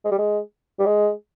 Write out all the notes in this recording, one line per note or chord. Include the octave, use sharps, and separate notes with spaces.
G#3
G3
G#3
G3
G#3